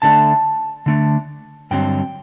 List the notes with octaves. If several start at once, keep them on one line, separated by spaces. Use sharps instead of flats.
D3 A3 D4 A5
D3 A3 D4
G2 D3 F#3 C4 G5